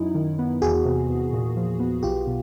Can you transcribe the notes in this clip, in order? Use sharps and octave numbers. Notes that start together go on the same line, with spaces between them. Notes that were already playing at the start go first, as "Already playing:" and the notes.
Already playing: F#2 F#3 D#4 E4
D#3
B3
E2 F#4 G#4
C3
E2
A#2
F3
B3
B1 F4 G4
B2